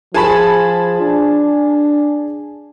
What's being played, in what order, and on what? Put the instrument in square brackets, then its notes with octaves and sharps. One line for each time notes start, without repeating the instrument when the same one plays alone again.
[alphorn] F3 [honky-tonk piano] G#4 A5 B5
[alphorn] D4